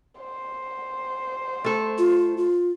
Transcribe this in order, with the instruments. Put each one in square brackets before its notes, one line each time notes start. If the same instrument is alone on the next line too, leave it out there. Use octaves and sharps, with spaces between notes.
[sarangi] C5
[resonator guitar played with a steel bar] A3 A4
[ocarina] F4
F4